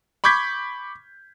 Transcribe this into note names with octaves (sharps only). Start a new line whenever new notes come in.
B5 C#6 D6 G6 G#6 B6